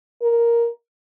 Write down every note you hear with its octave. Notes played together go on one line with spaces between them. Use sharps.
A#4